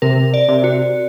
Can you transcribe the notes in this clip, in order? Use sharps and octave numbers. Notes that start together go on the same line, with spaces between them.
C3 A#4
D5
C3
F#4